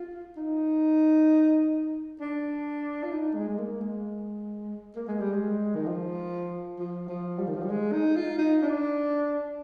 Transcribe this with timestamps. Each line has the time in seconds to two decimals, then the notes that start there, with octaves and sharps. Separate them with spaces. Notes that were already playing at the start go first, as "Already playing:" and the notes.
Already playing: F4
0.37 D#4
2.21 D4
3.03 F4
3.12 D#4
3.35 G#3
3.48 G#3
3.58 A#3
3.81 G#3
4.96 A#3
5.08 G#3
5.20 G3
5.33 G#3
5.75 D#3
5.86 F3
6.79 F3
7.09 F3
7.39 G3
7.48 D#3
7.55 F3
7.63 G3
7.70 G#3
7.93 D#4
8.16 F4
8.39 D#4
8.62 D4